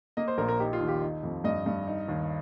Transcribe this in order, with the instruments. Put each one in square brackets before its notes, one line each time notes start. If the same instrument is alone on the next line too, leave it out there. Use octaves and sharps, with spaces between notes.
[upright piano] A#3 D#5
C5
A#1 A#4
A#4
D#4 G4
F4
D#2
G4
D#4
F2
G2 D#5
G2
D#4
D#2